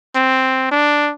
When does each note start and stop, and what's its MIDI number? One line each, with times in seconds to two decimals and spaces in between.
0.15 0.66 60
0.71 1.11 62